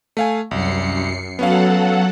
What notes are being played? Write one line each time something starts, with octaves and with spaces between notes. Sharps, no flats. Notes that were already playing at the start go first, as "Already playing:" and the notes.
A3 F5 G#5
C2 F#2 C7 C#7
F#3 B3 C#4 A4 F5 F#5